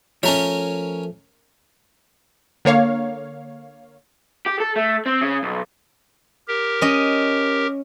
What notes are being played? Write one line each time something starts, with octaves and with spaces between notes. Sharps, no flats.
F3 A3 C#4 A#4 C#5
D3 A#3 C#5 F5
G4
A4
A3
C4
C#3
B1
G4 A#4
C#4 D#5